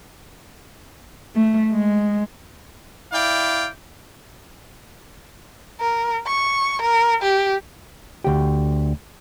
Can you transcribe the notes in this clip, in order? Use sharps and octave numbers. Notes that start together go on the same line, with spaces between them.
A3
G#3
E4 D5 F5 G5
A#4
C#6
A#4
G4
D2 G4